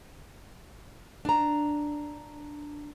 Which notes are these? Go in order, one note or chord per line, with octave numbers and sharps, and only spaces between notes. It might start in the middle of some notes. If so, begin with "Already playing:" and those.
D4 A#5